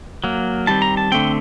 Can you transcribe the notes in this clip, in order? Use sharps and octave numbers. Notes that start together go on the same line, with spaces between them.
F#3 A#3
D#3 G3 C4 A5
A#5
A5
D3 A3 C4 G5